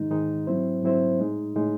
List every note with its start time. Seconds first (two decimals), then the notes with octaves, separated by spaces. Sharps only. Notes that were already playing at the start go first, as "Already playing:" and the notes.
Already playing: G#2 D#3 G#3 D#4
0.10 G#2 D#3 G#3 D#4
0.47 G#2 F#3 C4 E4 C5
0.82 G#2 F#3 C4 E4 C5
1.20 A2 G#3 D#4
1.55 A2 G#3 D#4